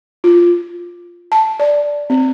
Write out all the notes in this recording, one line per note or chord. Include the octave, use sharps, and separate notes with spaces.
F4
A5
D5
C4